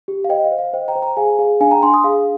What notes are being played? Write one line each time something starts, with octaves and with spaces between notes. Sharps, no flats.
G4
F5
C5 D#5 G5
F5
C5
F5
C5 D#5 G5
G5 A#5
C5
G5 A#5
G#4 F5 G#5
G#4 F5
D4 F5 G#5
G5 A#5
D4 G#5 C6
C6 D#6
G#4 F5